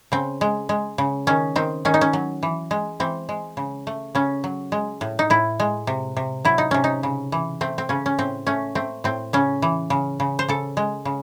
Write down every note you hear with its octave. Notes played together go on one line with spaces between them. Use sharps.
C#3 C4
G#3
G#3
C#3
D#3 C#4
D#3 C4
D#3 C#4
D#4
C#4
F#3
E3
G#3
E3 C4
G#3
C#3
A3
C#3 C#4
F#3
G#3
A2
D#4
A2 E4
G#3
C3
C3
F#3 E4
D#4
C3 C#4
D#4
C#3
E3
A3 C4
C4
C#3 C#4
C#4
A2 C4
A3 C#4
A3 C4
A2 C4
C#3 C#4
E3
C#3
C#3
C5
C#3 A4
G#3
C#3